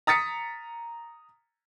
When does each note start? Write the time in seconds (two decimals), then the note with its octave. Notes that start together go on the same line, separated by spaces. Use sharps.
0.07 A#5 D#6 A6 B6 C#7